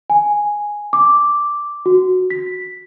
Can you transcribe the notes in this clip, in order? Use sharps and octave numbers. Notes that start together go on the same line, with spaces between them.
G#5
D6
F#4
B6